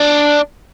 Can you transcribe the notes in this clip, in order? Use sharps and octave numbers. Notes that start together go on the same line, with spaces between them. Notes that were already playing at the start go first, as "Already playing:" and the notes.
Already playing: D4